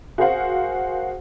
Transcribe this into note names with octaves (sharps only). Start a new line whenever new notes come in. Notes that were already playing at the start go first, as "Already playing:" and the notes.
F#4 G#4 A#4 C5 F5 F#5